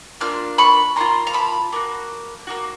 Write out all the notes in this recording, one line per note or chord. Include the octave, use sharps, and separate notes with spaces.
A#3 D4 F4 F6
B5 C#6
A#3 D4 F4 A#5 C6
A#5
A5 B5
A#3 D4 F#4
A#3 D4 F#4